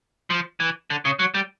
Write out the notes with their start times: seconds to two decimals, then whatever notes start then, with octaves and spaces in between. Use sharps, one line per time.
0.30 F3
0.60 E3
0.90 D3
1.05 C#3
1.19 F#3
1.34 G3